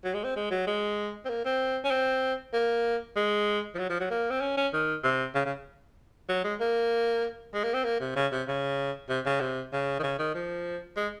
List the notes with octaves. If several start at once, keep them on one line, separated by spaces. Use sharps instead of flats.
F#3
G#3
C4
G#3
F#3
G#3
C4
A#3
C4
C#4
C4
A#3
G#3
F3
F#3
F3
F#3
A#3
C4
C#4
C#4
D#3
C3
C#3
C#3
F#3
G#3
A#3
G#3
A#3
C4
A#3
C3
C#3
C3
C#3
C3
C#3
C3
C#3
D#3
C#3
D#3
F3
G#3